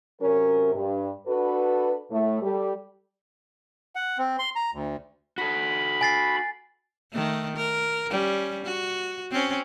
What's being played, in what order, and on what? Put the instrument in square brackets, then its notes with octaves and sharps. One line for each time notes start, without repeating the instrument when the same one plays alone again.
[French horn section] C3 F#3 C#4 A#4
G2
D4 F#4 A4 B4
A2 A3
G3 G4 A4
[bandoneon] F#5
C4
C6
A#5
D2
[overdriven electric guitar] F#4 A4 [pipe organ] B5
[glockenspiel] G#5 A6 C7
[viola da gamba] D#3 A3
A#4
G3 C#4
F#4
C4 C#4